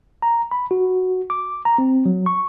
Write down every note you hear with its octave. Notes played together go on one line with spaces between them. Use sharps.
A#5
B5
F#4
D6
A#5
C4
F#3
C#6